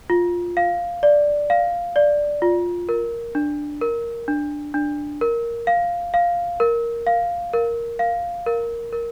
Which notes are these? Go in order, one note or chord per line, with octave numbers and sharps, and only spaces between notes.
F4
F5
D5
F5
D5
F4
A#4
D4
A#4
D4
D4
A#4
F5
F5
A#4
F5
A#4
F5
A#4
A#4